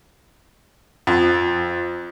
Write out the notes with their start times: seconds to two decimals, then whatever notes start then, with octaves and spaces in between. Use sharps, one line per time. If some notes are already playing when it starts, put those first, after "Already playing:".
1.07 F2